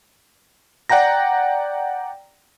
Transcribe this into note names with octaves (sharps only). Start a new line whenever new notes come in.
D5 F#5 G5 A#5 A#6